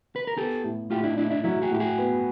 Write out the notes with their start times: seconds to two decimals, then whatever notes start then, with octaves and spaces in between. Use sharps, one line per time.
0.16 B4
0.27 A#4
0.37 B3 G4 A4
0.64 A2
0.91 A2 F4 G4
1.04 D4 E4
1.17 A2 D4 E4
1.30 D4 E4
1.44 F#3 E4 F#4
1.62 F#4 G#4
1.71 A2 G4
1.80 F#4 G#4
1.98 B3